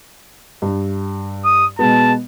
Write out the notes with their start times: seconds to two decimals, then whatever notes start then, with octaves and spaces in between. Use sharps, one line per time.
0.62 G2
1.45 D#6
1.79 B2 G#3 B3 A5